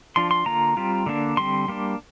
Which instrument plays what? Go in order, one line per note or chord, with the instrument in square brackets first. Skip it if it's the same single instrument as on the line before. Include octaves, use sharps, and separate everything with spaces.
[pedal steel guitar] F3 D4 F4 C6
C6
D3 A#3 F4 A#5
G3 C4 F4
D3 A#3 D4
D3 G3 C4 C6
G3 A#3 D4